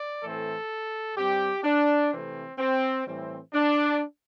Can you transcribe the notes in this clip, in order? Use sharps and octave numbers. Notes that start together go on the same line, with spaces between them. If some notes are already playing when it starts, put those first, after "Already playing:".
Already playing: D5
A2 E3 A3 C4 A4
G2 G3 C4 G4
D4
C3 E3 A3 C4
C4
A2 E3 G3 C4
D4